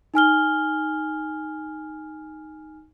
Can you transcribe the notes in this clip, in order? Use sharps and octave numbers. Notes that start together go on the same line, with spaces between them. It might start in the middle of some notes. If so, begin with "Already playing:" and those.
D#4 G#5 F6 G7